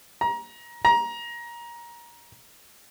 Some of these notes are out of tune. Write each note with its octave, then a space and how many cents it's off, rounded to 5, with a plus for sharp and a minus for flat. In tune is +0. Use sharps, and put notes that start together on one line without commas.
A#5 +25
A#5 +20